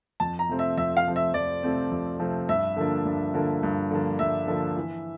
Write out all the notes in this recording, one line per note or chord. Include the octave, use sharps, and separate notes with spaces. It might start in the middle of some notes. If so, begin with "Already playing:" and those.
F2 A5
A#5
C3 F3 A3 C4
E5
F2 E5
F5
C3 F3 A3 C4
E5
F2 D5
C3 F3 A3 C4
F2
C3 F3 A3 C4
G2 E5
D3 F3 A#3 D4
G2
D3 F3 A#3 D4
G2
D3 F3 A#3 D4
G2 E5
D3 F3 A#3 D4
E3